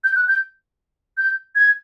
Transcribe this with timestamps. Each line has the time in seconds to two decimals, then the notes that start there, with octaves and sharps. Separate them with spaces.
0.04 G6
0.16 F#6
0.28 G6
1.17 G6
1.55 G#6